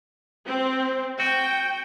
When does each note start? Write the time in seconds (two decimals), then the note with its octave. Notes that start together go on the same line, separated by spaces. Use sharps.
0.46 C4
1.20 F#4 G5